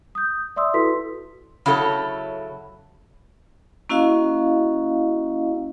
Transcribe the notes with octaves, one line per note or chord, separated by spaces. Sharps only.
D#6 G6
D5 E5 C6 D#6 E6
E4 F#4 A4 B4 C6 B6
C#3 F#3 E4 A4 C#5
A#3 C#4 E4 F#4 D#5 F5